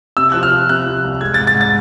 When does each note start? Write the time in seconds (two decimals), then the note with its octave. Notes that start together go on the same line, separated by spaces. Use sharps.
0.17 C3 E6
0.32 F3 F#6
0.43 F6
0.52 F3
0.69 C3 F#6
0.87 F3
1.04 C2
1.21 G#3 G#6
1.34 A6
1.39 G#2
1.47 A6
1.55 G#2
1.61 A6